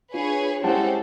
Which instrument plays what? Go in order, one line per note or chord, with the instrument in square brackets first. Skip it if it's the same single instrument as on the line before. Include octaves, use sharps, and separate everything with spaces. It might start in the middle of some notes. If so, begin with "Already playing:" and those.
[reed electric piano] D4 F4 [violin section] G#4 B4 C#5
[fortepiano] G3 G#3 [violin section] C4 C#4 A4 [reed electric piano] E4 F#5 A5